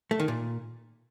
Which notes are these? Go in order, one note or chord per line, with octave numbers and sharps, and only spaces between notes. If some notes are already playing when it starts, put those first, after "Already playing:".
A3
D#3
A#2